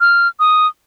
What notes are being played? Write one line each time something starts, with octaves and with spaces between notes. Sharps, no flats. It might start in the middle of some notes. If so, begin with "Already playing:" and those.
F6
D#6